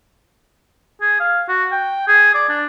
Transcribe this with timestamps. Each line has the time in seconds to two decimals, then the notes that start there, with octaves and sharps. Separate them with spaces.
1.01 G#4
1.20 F5
1.49 F#4
1.72 G5
2.08 G#4
2.34 D5
2.49 D4